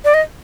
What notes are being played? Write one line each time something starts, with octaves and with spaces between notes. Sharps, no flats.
D5
D#5